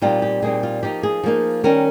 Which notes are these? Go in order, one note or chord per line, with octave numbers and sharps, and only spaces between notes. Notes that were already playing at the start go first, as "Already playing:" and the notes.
A#2 G3 C4 D#4 F4
G4
A#2 G3 C4 D#4 G#4
F4
F3 A#3 D#4 G4
G#4
F3 A#3 D#4
D#3 G3 C#4 A#4